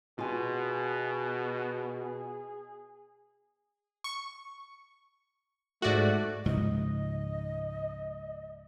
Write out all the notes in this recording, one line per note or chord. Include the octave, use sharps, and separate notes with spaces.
B2 F4 G#4 G#5
C#6
G#2 A3 F#4 D5 F#6
C#2 G#2 F3 D#5